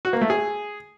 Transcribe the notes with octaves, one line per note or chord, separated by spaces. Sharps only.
F#4
A#3
A3
G#4